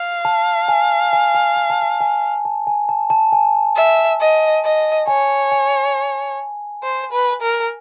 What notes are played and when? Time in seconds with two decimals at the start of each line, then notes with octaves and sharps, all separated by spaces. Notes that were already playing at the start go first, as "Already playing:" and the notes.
Already playing: F5
0.25 A5
0.68 G#5
1.13 G#5
1.35 G#5
1.56 G#5
1.70 A5
1.82 G#5
2.01 G#5
2.45 A5
2.67 G#5
2.89 A5
3.10 A5
3.32 G#5
3.76 E5
4.20 D#5
4.65 D#5
5.07 C#5 G#5
5.52 G#5
6.83 C5
7.12 B4
7.42 A#4